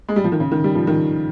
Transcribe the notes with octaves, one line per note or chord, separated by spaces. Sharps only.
G#3
G3
F3
D#3
C#3
D#3
G3
F3
D#3